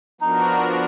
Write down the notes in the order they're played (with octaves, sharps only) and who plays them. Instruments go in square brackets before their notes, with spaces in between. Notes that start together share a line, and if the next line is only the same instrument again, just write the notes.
[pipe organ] F3 B3 D4 F#4 A#4 [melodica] D#4